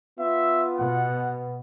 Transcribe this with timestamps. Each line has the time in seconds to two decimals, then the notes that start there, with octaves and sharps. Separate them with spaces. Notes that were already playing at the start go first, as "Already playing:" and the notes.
0.19 B3 F4 E5
0.78 B2 F#5